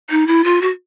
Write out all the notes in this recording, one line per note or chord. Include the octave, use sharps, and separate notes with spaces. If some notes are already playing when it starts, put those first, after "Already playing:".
D#4
E4
F4
F#4